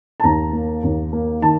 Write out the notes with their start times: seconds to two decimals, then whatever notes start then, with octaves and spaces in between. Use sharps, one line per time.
0.20 A5
0.23 D#2 A#5
0.53 A#3
0.83 D#2
1.13 A#3
1.42 D#3 A5